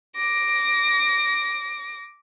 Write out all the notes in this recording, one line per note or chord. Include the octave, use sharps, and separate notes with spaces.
D6 A#6